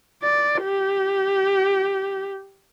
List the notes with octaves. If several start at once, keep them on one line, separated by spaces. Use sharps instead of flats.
D5
G4